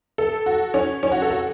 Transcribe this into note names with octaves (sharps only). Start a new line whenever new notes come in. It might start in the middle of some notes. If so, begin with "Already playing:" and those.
A4
F#4
C#4
C#4
F#4
A4
F#4